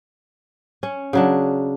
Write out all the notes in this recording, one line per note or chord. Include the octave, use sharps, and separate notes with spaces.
C#4
C#3 F#3 D4